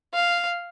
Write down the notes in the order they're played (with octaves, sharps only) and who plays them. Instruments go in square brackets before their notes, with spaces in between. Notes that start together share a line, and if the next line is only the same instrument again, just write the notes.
[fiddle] F5